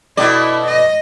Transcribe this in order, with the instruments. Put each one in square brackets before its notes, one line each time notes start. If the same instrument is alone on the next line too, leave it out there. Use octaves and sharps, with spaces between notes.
[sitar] B2 A3 D5 [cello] E4
[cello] D#5